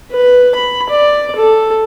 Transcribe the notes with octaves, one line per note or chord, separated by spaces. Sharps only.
B4
B5
D5
A4